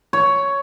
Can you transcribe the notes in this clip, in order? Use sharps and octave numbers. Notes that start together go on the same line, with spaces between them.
C#5